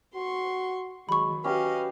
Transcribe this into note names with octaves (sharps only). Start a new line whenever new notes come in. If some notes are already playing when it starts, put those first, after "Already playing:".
F#4 C6 C#6
D#3 F#3 G#3 B5 C#6
C#4 F#4 G4 B4 D#5 F5